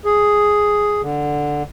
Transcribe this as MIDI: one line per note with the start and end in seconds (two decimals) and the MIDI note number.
0.05 1.01 68
1.01 1.63 50